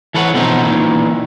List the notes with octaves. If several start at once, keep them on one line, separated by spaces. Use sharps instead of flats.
E3 A4 B4 C#5 F#5
B2 F3 C4 D#4 F4
A#2 D#3 E3